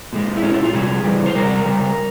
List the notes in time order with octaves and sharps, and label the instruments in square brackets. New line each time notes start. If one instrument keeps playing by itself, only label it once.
[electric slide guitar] A#2 G#3
E4
A#2 G#3 C#4
E4
F4
C3 G3 G#4
C#3 E3 G3
C5
C3 G3 A#4
C#3 G3